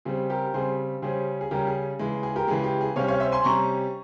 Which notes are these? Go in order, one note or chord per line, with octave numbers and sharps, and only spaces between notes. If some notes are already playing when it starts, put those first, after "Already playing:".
C#3 G3 C4 G#4
G4 A#4
C#3 G3 C4 G#4 C5
C#3 G3 C#4 G#4 C5
G#4
C#3 G3 C#4 G4 A#4
G#4
C#3 E3 G#3
G#4
G4 A#4
C#3 E3 G#3 G#4
G4
G#4
C3 G3 C#4 C#5 F5
C#5 F5
C5 E5
G#5 C6
C3 G3 C#4 A#5 C#6